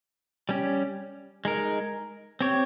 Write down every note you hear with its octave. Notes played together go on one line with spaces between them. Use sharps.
G3 C#4 G4
G#3 D#4 A#4
C4 G4 C#5